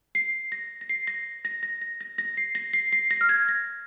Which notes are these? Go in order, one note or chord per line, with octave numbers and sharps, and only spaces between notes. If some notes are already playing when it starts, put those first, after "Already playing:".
C7
A#6
A#6
C7
A#6
A#6
A#6
A#6
A#6
A#6
C7
A#6
C7
C7
A#6
F6
G#6
A#6